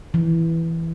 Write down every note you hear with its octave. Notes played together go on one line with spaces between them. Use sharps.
E3